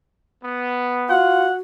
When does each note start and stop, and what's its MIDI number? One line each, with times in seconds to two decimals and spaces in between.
0.43 1.15 59
1.09 1.48 65
1.09 1.61 66
1.09 1.56 78